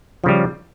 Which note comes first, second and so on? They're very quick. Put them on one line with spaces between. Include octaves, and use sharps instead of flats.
F3 C#3 G3